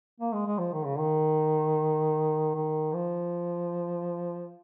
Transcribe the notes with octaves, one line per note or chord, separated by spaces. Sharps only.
A#3
G#3
G#3
F3
D#3
C#3
D#3
D#3
F3